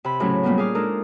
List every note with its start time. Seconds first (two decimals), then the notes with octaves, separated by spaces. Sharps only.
0.04 C3 B5
0.20 A2 C#3 F#3 A3 C#4
0.43 A#2 G3 A#3 B3
0.58 G#4 F5 D6
0.75 G#3 D4 D#4 A4 A#4